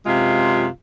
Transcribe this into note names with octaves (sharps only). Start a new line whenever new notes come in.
F#2 C3 G#3 F4